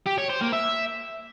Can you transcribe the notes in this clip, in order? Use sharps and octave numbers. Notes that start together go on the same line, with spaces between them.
G4
C#5
C5
A#3
E5